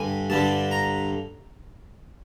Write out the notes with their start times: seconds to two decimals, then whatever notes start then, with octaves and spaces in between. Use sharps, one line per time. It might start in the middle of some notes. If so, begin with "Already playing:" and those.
Already playing: G2 D3 G3 G#5
0.30 G2 D3 G3 A5
0.71 A#5